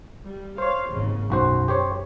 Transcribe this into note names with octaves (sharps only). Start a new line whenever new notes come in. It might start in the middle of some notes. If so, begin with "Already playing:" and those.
G3
C5 C#5 F5
G#1 D#2 C#3
B1 F#2 F#4 C5
G4 C5 C#5